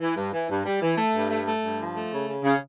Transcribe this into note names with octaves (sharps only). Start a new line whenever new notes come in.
E3
G2
E3
G2
G3
E3
A3
G2
A3
A3
G2
F3
A3
C#3
C#3
C#3